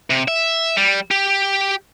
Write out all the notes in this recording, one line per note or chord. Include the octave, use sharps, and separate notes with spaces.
C3
E5
G3
G4